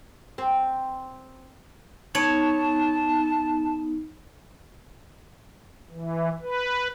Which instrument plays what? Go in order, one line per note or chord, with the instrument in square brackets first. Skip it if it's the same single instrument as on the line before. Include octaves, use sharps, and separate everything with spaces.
[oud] C4
[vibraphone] B3 D#4 [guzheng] C#5 [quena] A5
[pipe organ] E3
B4